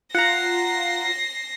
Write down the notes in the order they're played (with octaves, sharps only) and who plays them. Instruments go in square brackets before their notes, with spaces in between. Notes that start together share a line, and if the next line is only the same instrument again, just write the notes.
[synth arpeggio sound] F4 [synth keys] F#5 A#5 [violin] A#6 C7